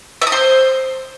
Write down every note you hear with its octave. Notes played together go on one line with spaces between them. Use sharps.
E5
D#6
C5